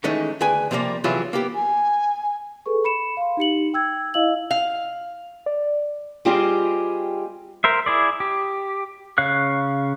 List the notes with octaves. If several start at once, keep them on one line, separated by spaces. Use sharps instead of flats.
D#3 E3 G#3 A3 C#4 D#4
D2 G#4 B4 G5 G#5
C3 F3 G3 G#3 A#3
C3 E3 F#3 E4 F4 G#4
A#3 B3 G4
G#5
G#4 A4 B4 C#6
B5 C#7 E7
F5 C6
D#4 G4 C#7 F#7
G5 E6 G#6
E4 D#5 F5 E6 F#7
F5
D5
G3 C4 F4 G4 G#4 D#5
A#4 C5 E5
E4 G#4 D5
G4
C#3 C#5 F5 F#6